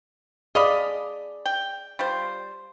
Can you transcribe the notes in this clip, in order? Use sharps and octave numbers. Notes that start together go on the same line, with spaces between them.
G#4 D5 D#5 F5 B5
G5
G3 F4 C5